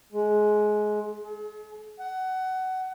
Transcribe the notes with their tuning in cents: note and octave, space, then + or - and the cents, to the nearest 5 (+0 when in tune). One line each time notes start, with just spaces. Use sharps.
G#3 +20
G#4 +45
F#5 +20